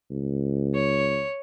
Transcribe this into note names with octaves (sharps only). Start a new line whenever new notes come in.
C#2
C#5